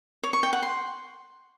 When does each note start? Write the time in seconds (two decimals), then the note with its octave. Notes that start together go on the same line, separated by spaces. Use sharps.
0.23 C#5
0.33 C#6
0.43 G5
0.53 F#5
0.63 C6